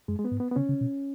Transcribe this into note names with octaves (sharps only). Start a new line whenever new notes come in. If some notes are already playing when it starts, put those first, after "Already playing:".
F#2 G#3
G#3
B3
G#2
B3
B3
C#3 C#4
C#3
B2